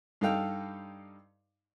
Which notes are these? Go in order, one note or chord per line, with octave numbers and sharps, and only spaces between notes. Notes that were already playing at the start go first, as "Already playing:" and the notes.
G2 D#4 A4 F5 G5